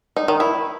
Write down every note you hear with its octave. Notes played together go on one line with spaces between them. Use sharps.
D#4
D#3
E4